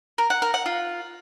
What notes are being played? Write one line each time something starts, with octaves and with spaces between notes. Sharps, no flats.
A#4
F#5
A#4
F#5
F4